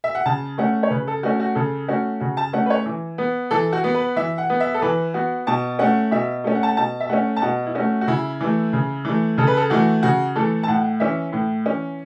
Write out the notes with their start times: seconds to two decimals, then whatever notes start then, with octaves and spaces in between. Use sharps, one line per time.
0.04 E5
0.15 F#5
0.26 C#3 A5
0.58 A3 C#4 F#5
0.83 C#5
0.90 C#3 B4
1.08 A4
1.23 A3 C#4 F#4
1.40 F#4
1.55 C#3 A4
1.88 A3 C#4 F#4
2.20 C#3 F#4
2.37 A5
2.53 A3 C#4 F#5
2.66 B4
2.70 C#5
2.86 E3
3.18 B3
3.51 E3 A4
3.73 F#4
3.84 B3
3.95 B4
4.16 E3 E5
4.38 F#5
4.50 B3
4.60 E5
4.74 A4
4.82 E3 B4
5.14 B3 F#4
5.47 B2 A5
5.79 A3 C#4 F#5
6.11 B2 E5
6.44 A3 C#4
6.55 F#5
6.63 A5
6.69 F#5
6.77 B2 A5
7.00 E5
7.09 A3 C#4 F#5
7.36 A5
7.42 B2 F#5
7.66 E4
7.75 A3 C#4 F#4
8.01 F#4
8.07 C#3 E4
8.41 E3 A3
8.73 C#3
9.05 E3 A3
9.38 C#3 A4
9.47 B4
9.57 A4
9.70 E3 A3 F#4
10.03 C#3 F#4
10.36 E3 A3 A4
10.63 A5
10.68 A2 F#5
11.00 E3 C#4 E5
11.33 A2
11.66 E3 C#4